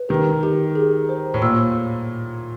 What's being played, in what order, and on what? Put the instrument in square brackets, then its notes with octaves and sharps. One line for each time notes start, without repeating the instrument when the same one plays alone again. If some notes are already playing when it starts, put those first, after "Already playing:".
Already playing: [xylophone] B4
[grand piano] D#3 [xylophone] G4
[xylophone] G4
G#4
C5
[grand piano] A2
[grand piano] A#2 [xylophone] E6